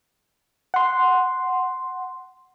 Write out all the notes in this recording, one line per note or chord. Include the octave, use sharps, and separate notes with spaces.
F#5 C6